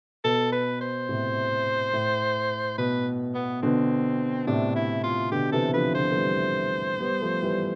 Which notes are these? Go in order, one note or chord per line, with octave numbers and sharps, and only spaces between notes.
B2 A4
B4
C5
A2 C3
A2
B2 B4
B3
B2 D3 C4
A2 C3 D4
E4
F4
B2 D3 G4
C3 E3 A4
D3 F3 B4
D3 F3 C5
A3
E3 G3
G3 B3
F3 A3
E3 G3